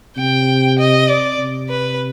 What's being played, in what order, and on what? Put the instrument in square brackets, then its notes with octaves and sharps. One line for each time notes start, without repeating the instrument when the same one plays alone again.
[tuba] C3 [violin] G5
[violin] D#5
D5
[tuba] C3
[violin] B4